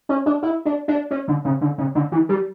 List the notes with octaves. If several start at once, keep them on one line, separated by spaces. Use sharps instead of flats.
C#4
D4
E4
D4
D4
C#4
D3
C#3
D3
C#3
D3
E3
G3